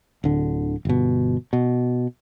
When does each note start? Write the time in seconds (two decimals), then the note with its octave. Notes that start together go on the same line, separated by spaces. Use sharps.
0.24 D1 D3
0.85 G1 B2
1.53 B2